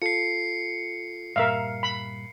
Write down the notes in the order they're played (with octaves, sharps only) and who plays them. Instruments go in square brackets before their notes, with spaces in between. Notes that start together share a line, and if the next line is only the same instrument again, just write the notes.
[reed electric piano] F4 A4 [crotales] C7 C#7
[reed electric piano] G2 A#2 G3 [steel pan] A#4 E5 F5
[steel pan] B5